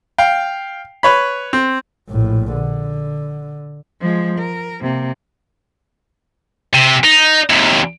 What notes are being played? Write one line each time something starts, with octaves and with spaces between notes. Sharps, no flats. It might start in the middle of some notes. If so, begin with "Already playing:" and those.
F5 G5
B4 C#5 B5
C4
A#1 A2
D3
F3 G#3
A#4
C3 A#3
C3
D#4
D#2 C3